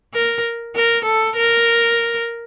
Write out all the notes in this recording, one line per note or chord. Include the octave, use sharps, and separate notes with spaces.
A#4
A#4
A4
A#4